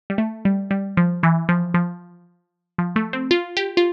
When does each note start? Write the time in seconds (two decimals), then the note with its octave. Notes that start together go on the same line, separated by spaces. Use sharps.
0.10 G3
0.18 A3
0.45 G3
0.71 G3
0.97 F3
1.23 E3
1.49 F3
1.74 F3
2.78 F3
2.96 A3
3.13 C4
3.31 F4
3.57 G4
3.77 F4